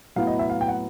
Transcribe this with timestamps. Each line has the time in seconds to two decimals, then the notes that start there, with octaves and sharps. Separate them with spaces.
0.16 A2 F#3 B3 E4 F5
0.27 D#5
0.39 E5
0.50 F5
0.61 G5
0.68 F#5